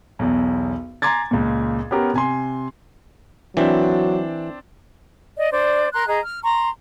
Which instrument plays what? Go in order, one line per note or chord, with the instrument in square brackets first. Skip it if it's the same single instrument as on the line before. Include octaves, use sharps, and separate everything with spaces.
[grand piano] B1 E2
G#5 A#5 C6 D6 G#6 A6
C#2 A#2
B3 C#4 G4 A#4
C3 G#5 C6
[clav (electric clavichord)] E3 [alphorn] F#3 [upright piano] C4 D4
[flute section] D5 D#5
D4 C5 D5
A#4 A#5 C6 F#6
G#4 D#5 A#5
F6
A#5 C6 C#6